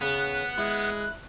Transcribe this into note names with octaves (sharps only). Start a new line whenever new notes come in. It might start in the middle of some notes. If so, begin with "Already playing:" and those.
C#3 B3 F#6
G#3 E4